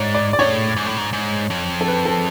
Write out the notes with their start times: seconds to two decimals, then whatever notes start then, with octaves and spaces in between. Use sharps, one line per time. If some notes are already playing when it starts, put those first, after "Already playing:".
Already playing: G#2 C#5 D5
0.14 D5
0.33 D5
0.39 A2 C#5
0.77 G#2
0.86 A2
0.98 G#2
1.13 G#2
1.50 F2
1.81 A4
1.88 B4
2.05 A4